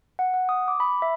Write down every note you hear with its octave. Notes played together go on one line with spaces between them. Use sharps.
F#5
F#5
D#6
D6
B5
E5